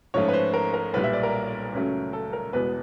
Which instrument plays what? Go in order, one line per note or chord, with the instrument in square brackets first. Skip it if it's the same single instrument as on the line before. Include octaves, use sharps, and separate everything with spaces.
[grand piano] G#2 F3 A3 C#4 C#5
B4
C5
A#4
A#4
B1 A#2 G3 B4
E5
D5
A#4
C#2 C#3 F#3 A3 C#4
A4
A#4
E1 E2 B2 G#3 B3 B4